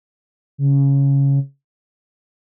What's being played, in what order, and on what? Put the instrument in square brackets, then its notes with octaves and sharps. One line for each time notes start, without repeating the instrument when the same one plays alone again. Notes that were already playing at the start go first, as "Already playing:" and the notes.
[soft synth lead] C#3